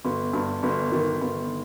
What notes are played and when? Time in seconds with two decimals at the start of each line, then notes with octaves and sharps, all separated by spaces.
0.05 G1
0.33 G2
0.63 G1
0.92 D#3
1.21 G1